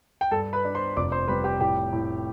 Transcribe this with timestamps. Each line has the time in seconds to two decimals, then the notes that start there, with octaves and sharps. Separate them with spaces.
0.21 G5
0.31 G2 A4 A5
0.53 B4 B5
0.65 D4
0.75 C5 C6
0.96 F1 D5 D6
1.12 C5 C6
1.28 G3 B4 B5
1.44 G4 G5
1.60 A2 G4 G5
1.93 A2